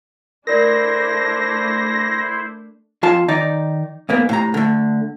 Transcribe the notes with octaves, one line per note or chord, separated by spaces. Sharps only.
A3 D4 E4 A#4 C5 D5 A#6
F2 F4 A5
D#3 D#4 D5
G#2 A#3 B3
A2 C3 A#5
D3 A3